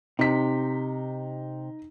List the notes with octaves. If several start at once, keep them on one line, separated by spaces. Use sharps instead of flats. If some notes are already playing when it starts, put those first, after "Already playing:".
C3 D#4 B6